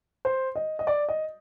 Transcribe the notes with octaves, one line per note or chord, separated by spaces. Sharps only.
C5
D#5
D#5
D5
D#5